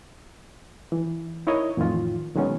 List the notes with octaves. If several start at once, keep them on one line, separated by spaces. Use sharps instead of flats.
E3
D#4 E4 A#4 C#5 D#5
F2 A2 D#3 E3 F4
B2 D#3 F#3 G#3 B3 C#4